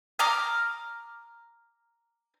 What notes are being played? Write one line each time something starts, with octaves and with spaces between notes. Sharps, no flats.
A#5 D6 D#6 F6